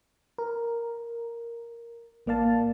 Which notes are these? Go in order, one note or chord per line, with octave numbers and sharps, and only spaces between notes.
A#4
A1 A#3 D5 F5 A5